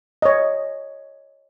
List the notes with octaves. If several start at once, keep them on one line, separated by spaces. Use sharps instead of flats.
C#5 D#5